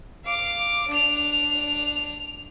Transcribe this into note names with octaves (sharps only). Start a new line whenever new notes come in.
F5 D6
D4 F7